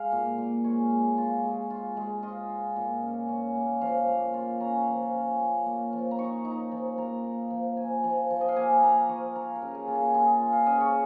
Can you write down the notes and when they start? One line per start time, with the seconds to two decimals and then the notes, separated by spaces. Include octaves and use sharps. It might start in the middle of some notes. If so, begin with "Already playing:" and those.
Already playing: G#3 F5
0.12 A#2
0.38 A#2
0.64 G#3 C#5
0.91 G#3
1.18 F4
1.44 G#3
1.70 F4
1.97 G#3
2.23 F4 D#5
2.50 F4
2.76 A#2
3.02 C#4
3.29 C#4
3.55 A#3
3.81 F3 F5
4.08 A#3
4.34 F4
4.60 C#4 A#5
4.87 F3
5.14 C#4
5.40 A#3
5.66 A#3
5.93 F3
6.11 A#5
6.19 D#4 C#6
6.45 D#4
6.71 F3
6.98 A#3 A#5
7.24 A#3
7.50 F3
7.77 F3 G#5
8.04 F3
8.30 F3
8.41 D#5
8.49 F5
8.56 A#3 G#5
8.83 A#3 A#5
9.09 F3 C#6
9.36 F4 A#5
9.56 A#4
9.62 C#3
9.75 G#4
9.87 A#3 F4
9.95 G#4
10.06 A#4
10.14 F4 G#4
10.41 F4
10.53 F5
10.66 C#3 D#5
10.80 C#5